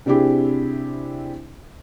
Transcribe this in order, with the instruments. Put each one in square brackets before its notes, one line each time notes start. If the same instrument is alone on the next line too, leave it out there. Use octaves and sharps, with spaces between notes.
[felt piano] C3 C4 D4 E4 G4 G#4